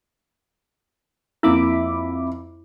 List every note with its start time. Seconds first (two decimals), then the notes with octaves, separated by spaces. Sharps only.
1.43 F2 A#3 E4 E5 B5 D6